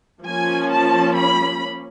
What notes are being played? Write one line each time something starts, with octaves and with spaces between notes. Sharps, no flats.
F3 A#3 C#4 G#5
A5
B5